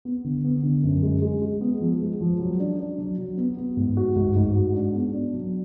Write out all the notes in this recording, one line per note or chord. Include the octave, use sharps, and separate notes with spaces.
B3
D3
B3
D3
F#2
G#3
G#3
G#3
B3
F3
G#3
F3
F#3
D4
D4
F#3
F#3
B3
B3
G#2
F#4
G#2
G#2
F#4
D4
B3
D4
F#3